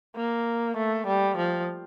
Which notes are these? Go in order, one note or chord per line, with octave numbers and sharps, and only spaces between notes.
A#3
A3
G3
F3